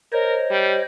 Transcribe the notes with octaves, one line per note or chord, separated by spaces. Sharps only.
A#4 C5 C#5 D#5
G3